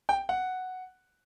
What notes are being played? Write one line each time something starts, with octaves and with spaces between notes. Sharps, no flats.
G5
F#5